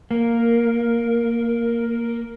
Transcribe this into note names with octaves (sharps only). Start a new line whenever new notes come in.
A#3 A#4